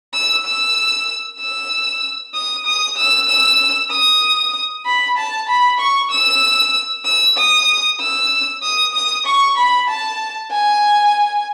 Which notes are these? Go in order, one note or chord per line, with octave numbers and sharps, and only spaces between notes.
E6
E6
E6
D#6
D#6
E6
E6
D#6
B5
A5
B5
C#6
E6
E6
D#6
E6
D#6
D#6
C#6
B5
A5
G#5